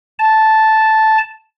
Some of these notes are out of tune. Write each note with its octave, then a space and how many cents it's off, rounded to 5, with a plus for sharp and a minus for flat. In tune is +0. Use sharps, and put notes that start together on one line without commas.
A5 -5